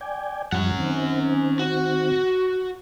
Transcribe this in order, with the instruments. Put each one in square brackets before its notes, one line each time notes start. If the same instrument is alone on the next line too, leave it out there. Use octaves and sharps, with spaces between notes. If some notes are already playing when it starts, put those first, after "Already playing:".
[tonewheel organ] D5 G5 G#5
[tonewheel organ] F#2 F3 G3 [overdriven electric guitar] C#4 F#5
[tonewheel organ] D#3 C4
[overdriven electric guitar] F#4